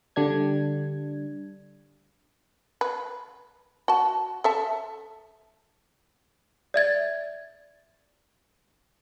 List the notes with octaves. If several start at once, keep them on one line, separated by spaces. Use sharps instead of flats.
D3 G3 D4 G#6
B4
F#4 A5
A4 E5 A5
D5 E5 G#6 A6